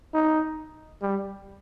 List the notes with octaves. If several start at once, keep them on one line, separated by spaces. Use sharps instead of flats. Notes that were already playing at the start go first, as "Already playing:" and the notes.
D#4
G3